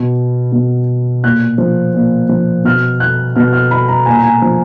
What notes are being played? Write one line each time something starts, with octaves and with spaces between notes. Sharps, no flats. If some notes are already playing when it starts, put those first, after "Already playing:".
Already playing: B2
B2
A#2 F#6
F3
A#2
F3
B2 F6
F#6
B2 F6
F6
B5
A#5
A#2 G#5
A#5
G#5
F3